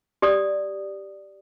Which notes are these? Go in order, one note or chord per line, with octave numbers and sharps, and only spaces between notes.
G4 D5 D#6